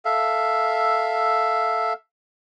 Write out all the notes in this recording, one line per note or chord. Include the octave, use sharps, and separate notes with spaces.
A4 E5 F5